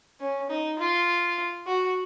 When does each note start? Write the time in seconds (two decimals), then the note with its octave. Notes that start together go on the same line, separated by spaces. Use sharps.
0.20 C#4
0.50 D#4
0.79 F4
1.67 F#4